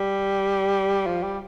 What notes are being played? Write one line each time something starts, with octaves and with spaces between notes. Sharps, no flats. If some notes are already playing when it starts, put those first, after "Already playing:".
Already playing: G3
F3
G3